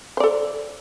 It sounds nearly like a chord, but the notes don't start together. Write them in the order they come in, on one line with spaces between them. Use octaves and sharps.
C5 D5 A4